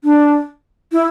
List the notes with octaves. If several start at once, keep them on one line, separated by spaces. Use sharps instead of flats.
D4
E4